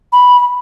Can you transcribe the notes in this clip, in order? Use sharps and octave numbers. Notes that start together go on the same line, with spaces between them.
B5